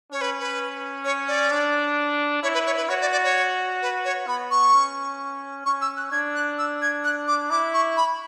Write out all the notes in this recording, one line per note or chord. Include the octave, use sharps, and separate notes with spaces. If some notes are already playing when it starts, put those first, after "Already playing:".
C#4 C#5
B4
B4
C#5
D5
D4
E4 C#5
B4
C#5
B4
F#4 C#5
D5
D5
C#5
B4
C#5
B3 B5
C#6
C#4
C#4 C#6
E6
F#6
D4 G#6
F#6
E6
G#6
F#6
D6
E4 D6
C#6
B5